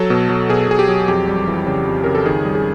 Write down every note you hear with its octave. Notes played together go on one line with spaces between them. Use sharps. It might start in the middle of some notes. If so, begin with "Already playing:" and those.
Already playing: F#3 A4
B2
F#3
B2 G#4
B2 G#4
G4
F#3
F2 G4
G3
E3
C#3
F2
C#3 A#4
A4
D#3 G#4
G3
G#4